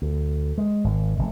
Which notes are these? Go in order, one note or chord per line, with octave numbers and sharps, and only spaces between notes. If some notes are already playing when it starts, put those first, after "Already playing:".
D2
G#3
G#1
F1